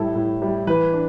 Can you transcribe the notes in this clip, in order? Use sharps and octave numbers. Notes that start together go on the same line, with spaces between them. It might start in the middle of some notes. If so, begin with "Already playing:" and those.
Already playing: A2 G3 E4 A4
A2
G3 E4
E3 B4
D4